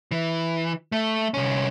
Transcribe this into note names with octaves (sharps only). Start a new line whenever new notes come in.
E3
A3
C2 C#4